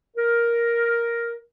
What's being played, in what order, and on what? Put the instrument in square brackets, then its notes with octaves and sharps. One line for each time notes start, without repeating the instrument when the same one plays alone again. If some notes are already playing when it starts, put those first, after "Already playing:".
[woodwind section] A#4